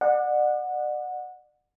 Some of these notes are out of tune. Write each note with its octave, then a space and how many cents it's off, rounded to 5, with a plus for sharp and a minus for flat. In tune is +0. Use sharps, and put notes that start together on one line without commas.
D5 +35 F#5 -20